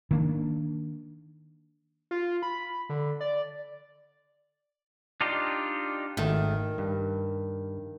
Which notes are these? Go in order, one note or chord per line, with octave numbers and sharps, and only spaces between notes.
D#3 A#3 D4
F4
B5
D3
D5
D4 D#4 F4 G4
G#1 D#3 A3 A5
G2